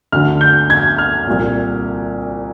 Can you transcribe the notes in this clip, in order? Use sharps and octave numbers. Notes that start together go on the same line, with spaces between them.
D2 D3 F6
G6
G#6
F6
C2 A#2